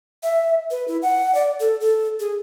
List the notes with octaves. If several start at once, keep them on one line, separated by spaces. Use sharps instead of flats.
E5
B4
E4
F#5
D5
A4
A4
G#4